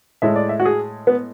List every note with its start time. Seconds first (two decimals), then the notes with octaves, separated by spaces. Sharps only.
0.22 A2 G#3 E5
0.36 D5
0.49 E5
0.60 F#4
0.65 G#4
1.07 B3